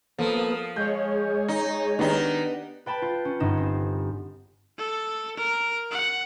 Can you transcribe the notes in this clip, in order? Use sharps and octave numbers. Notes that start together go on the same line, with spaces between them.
F3 A#3 B3 A4 D#6
G#3 G#4 C#5 G6
D#4
D#3 B3 D4 D#4 G4
B4 G5 A5 B5
F4
C#4
G1 G2 D#4 E7
C4
A4
A#4
F#5